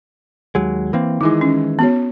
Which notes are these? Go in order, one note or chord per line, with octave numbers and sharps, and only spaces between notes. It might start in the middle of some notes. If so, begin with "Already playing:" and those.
D#2 F#3 G#3
E3 A#3 C4
D#3 E3 G#3 D#4 E4
C#4
B3 F#4 C#5